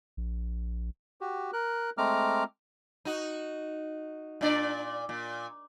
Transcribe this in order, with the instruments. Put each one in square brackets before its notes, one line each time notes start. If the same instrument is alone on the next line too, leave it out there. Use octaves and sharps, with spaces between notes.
[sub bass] A#1
[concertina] F#4 G4
A#4 F#6
G#3 A3 C4 A#5 D6 F6
[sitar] D#4 F#4
A#2 D4 D5
A#2